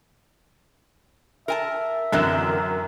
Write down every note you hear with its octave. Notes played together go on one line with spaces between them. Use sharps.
A#4 E5 G#5 A5
F#2 D3 E3 C4 A#4 F#6 E7